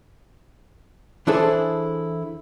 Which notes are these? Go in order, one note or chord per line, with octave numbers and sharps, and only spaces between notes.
E3 D4 E4 G#4 A4 C5